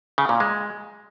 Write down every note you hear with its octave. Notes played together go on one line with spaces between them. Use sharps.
C#3
A#2
G#3